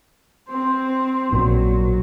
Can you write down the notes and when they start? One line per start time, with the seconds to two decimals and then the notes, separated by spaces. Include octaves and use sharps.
0.50 C4 C5
1.32 A#1 A#2 F#3